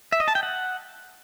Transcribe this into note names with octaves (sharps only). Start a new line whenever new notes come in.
E5
D#5
A5
G5
F#5